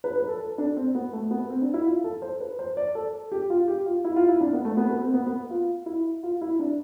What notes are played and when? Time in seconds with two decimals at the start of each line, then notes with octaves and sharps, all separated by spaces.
0.04 B4
0.16 B4
0.28 A4
0.40 A4
0.58 D4
0.77 C4
0.95 B3
1.13 A3
1.31 B3
1.50 C4
1.62 D4
1.74 E4
1.86 F4
2.04 A4
2.22 C5
2.40 B4
2.59 C5
2.77 D5
2.95 A4
3.32 G4
3.50 F4
3.68 G4
3.86 F4
4.04 E4
4.16 F4
4.28 E4
4.41 D4
4.53 B3
4.65 A3
4.77 B3
4.90 B3
5.01 C4
5.14 B3
5.26 B3
5.50 F4
5.86 E4
6.23 F4
6.41 E4
6.59 D4